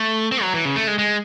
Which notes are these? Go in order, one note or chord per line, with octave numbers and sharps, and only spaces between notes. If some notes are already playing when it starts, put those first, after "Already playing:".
Already playing: A3
C4
F#3
E3
C#3
A3
G#3
G#3